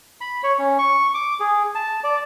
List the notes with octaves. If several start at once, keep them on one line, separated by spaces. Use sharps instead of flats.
B5
C#5
C#4
C#6
D6
G#4
A5
D5